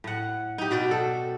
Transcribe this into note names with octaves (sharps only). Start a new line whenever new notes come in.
A2 F#5
D#4 G4
B2 F#4 D5
A4